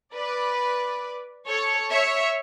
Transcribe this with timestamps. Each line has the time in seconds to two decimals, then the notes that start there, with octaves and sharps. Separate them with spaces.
0.14 B4 D5
1.46 A4 C#5
1.91 C#5 E5